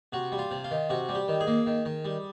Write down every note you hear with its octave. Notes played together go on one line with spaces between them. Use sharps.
C3 F#4
G3
F4
C3
F4
D#3
C3 F#4
G3
G4
D#3
G#4
A#3
D#3
D#3
G3